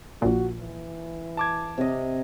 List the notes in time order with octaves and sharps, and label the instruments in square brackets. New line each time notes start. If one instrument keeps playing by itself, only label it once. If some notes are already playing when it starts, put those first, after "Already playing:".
[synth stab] A#1 A#2 [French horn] F#4
[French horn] E3
[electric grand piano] A5 D6 G#6
[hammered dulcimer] C3 D#5